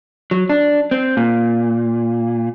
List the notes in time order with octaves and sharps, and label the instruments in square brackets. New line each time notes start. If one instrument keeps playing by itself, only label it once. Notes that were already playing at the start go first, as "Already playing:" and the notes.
[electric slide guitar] F#3
D4
C4
A#2